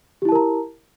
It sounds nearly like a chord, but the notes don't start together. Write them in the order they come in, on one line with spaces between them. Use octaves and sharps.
G4 E4 A5 A#4 A#5